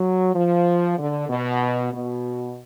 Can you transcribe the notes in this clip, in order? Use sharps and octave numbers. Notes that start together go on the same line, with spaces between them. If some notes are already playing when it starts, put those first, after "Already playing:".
Already playing: F#3
F3
D3
B2
B2